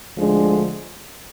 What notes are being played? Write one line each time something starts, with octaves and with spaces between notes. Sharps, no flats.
D2 D3 F3 G#3